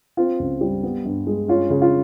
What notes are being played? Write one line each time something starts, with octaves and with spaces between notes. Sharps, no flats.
C4 F4
C#2
G3
B3
G2
G#3
C#4 F4
C#3
F4